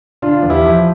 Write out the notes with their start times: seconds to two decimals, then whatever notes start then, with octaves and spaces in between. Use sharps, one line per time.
0.22 D3 D4 F4
0.43 E2
0.50 E4 G4
0.64 F3